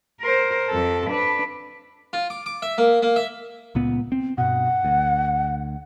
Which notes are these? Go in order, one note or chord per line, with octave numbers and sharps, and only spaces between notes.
A#4 C5
F2 A4
D4 B4
F4
D6
D6
E5
A#3
A#3
E5
C#2 A#2 B3
C4
G2 B2 F#5
D2